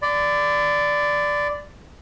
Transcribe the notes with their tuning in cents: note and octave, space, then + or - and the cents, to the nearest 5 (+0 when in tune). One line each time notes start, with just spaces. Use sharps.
D5 +0 B5 +45